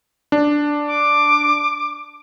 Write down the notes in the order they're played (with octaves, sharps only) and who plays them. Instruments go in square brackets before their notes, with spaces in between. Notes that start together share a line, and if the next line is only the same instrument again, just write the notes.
[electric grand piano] D4
[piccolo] D6